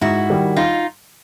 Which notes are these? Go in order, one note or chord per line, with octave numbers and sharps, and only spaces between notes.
G#2 E4 F#4
D#3 G3
D#4 F4